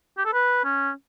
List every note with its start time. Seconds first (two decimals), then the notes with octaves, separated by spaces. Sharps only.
0.18 G4
0.26 A4
0.33 B4
0.64 C#4